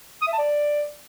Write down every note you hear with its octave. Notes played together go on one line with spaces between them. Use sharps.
D#6
E5
A5
D5